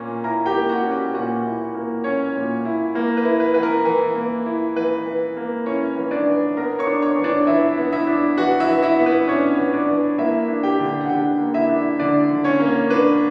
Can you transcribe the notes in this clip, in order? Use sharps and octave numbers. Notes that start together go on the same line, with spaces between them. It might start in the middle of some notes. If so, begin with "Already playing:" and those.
Already playing: A#2 A#3 C#4
E4 A#4 A#5
G4 G5
A#3
F#4 F#5
C#4
G4 G5
A#2 F#4 F#5
E4
A#3
C#4 C#5
A#2
E4
A#3
B4
E4
B4
E3 B4
A#4
E3
A#3
E4
E3 B4
E3
A#3
C#4 E4 C#5
E3
D4 D5
E3
B3 A#4 A#5
C#5 C#6
D4
C#5 C#6
E3
D4 D5
E3 E4 E5
B3
E4 E5
D4
E3 F#4 F#5
E4 E5
E3
E4 E5
B3
B4
C#4 D4 C#5
E3
D4 D5
E3
A#3 E4 E5
D4
G4 G5
D3
F#5
D3 G4 G5
A#3
E4 E5
D4
D3 D4 D5
D3
C#4 C#5
A#3
D4 B4